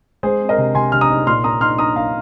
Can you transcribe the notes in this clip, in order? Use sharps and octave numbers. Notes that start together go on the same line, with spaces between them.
G#3 G#4 C5
C4
A#4 D#5
C3
C3 G#5 C6
C3 F6
A#5 D#6
D#4
A#2 C6 F6
A#3 A#5 D#6
D#4 C6 F6
D#4 A#5 D#6
A#3 F5 A#5